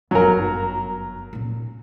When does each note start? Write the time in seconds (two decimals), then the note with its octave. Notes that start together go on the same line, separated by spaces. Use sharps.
0.11 G1 F#2 F#3 A#4
1.33 A#2 C#4